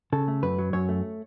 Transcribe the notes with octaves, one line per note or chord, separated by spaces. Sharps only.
C#3 A4
A3
F#2 B4
F#3
F#2 C#5
A3